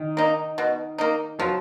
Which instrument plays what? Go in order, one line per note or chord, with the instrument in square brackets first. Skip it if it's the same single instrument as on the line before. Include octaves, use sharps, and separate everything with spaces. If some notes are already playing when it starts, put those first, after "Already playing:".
Already playing: [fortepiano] D#3
[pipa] A#3 D#4
B2
A#3 D#4
[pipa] F3 [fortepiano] F#3